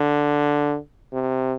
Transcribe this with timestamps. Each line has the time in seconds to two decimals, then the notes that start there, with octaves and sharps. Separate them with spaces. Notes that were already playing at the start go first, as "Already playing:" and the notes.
Already playing: D3
1.13 C3